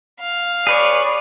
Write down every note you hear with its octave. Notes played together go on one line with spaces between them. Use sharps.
F5
G#4 B4 C#5 D5